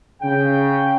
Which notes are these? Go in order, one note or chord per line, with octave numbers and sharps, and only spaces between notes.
C#3 G5